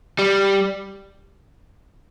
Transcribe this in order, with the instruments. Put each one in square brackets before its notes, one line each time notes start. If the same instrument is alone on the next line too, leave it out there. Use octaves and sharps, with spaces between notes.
[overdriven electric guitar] G3